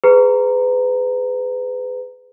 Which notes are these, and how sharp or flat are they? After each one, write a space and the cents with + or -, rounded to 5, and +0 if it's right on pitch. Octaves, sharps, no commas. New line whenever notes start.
G#4 +0 B4 +30 A#5 -10